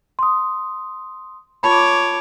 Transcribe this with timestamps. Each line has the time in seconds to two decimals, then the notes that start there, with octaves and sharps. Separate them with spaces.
0.19 C6 D#6
1.63 F4 C#5 A5 B5 D6